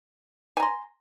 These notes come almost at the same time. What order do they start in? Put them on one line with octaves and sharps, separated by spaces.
G#5 A#5 C6